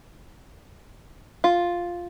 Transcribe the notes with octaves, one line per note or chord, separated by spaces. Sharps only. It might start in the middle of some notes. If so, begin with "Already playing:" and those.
F4